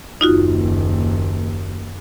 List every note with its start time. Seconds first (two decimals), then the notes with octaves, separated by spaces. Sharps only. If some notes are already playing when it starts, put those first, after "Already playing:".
0.21 F#1 D#2 D#4 F4 F#4